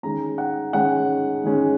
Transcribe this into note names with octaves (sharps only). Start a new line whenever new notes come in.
D#3 G#3 C#4 A#5
F#5
D#3 G#3 C#4 F#5
D#3 G#3 C#4